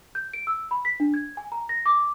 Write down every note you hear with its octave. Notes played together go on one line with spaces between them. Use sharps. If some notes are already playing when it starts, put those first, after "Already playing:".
G6
D7
E6
B5
B6
D4
G#6
G#5
A#5
A#6
D6